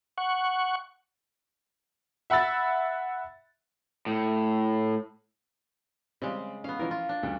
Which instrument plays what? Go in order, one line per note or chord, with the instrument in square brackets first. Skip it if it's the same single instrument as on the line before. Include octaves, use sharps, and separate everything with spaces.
[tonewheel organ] F#5 C#6
[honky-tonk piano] E5 F#5 B5 E6 A6
[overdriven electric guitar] A2
[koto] C#3 G#3 [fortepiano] G3 C4
[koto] B3 F5 [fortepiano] C#4
[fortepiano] E3 F3 C#4 [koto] A#4
[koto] F4
D4
[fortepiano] D2 G2 C#3